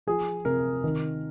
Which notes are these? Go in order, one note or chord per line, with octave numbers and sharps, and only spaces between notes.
F3 G#4
C3 A#4
D#3